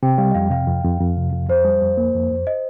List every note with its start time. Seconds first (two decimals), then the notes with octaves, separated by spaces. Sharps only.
0.03 C3 G5
0.18 G3 F5
0.30 D#5
0.35 F2 F5
0.50 C3 F5
0.67 F2
0.84 F2
1.01 F2
1.17 C3
1.33 F2
1.49 F2 C5
1.65 G3
1.81 F2
1.97 A#3
2.15 F2
2.31 F2
2.47 D#5